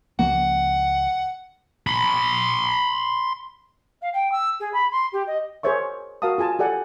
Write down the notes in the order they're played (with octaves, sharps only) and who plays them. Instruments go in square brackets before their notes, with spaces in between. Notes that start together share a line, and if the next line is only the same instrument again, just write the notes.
[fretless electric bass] C#2 F3 A#3 [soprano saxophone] F#5
[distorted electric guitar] B5 C6
[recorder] F5
G5
E6
G#4
B5
C6
G4
D#5
[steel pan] G#4 A#4 C5 C#5 E5 C#6
F#4 A#4 F5 A5 D#6
F4 G#4 G#5 A5
G4 A4 D5 F#5 G#5